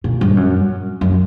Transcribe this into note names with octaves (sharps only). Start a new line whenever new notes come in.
A#2
G2
F#2
F#2